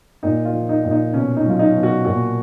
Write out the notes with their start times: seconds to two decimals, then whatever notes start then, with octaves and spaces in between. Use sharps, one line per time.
0.23 A#2 D#4
0.45 F4
0.53 F3
0.69 D#4
0.84 A#2
0.91 D#4
1.14 B2 C#4
1.36 D#4
1.45 F#3 F4
1.59 D#4
1.75 B2
1.83 F#4
2.05 A#2 F#4